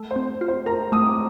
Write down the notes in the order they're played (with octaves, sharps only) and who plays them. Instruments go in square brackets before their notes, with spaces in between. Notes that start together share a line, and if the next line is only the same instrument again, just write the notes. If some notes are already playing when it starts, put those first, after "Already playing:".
Already playing: [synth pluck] A3
[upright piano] C5
[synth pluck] C4
F4
[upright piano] C5
[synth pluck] A#4 [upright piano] A#5
[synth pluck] A3 [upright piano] D#6
[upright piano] D6